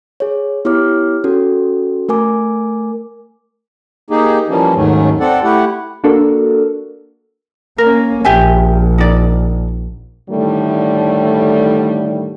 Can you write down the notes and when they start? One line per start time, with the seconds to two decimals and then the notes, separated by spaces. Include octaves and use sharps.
0.20 G#4 C#5
0.65 B3 E4 G4 C#5 D6 F6
1.24 C#4 F#4 A4
2.09 A3 A#4 G#5 D6
4.10 A#3 D#4 G4 G#4
4.49 E3 F3 G3 A#3 C#4
4.75 D#2 G#2 D#3 F#3 A3 C#4
5.20 C4 A4 D5 F#5
5.43 A3 E4 G4 F#5
6.04 A#3 D4 F#4 A4 A#4
7.78 A#3 C#4 A#4
8.25 A#1 G4 E5 G#5
8.98 D#4 D5
10.29 A2 D3 D#3 G3 A3